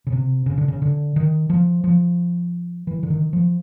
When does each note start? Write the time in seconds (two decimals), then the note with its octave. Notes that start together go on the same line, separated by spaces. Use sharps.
0.07 C#3
0.12 C3
0.46 C#3
0.58 D3
0.68 C#3
0.82 D3
1.16 D#3
1.50 F3
1.84 F3
2.87 E3
3.03 D3
3.10 D#3
3.33 F3